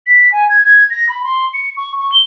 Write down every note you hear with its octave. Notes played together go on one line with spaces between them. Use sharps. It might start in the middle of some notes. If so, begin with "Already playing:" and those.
B6
G#5
G#6
G#6
A#6
B5
C6
C#7
C#6
C#6
G7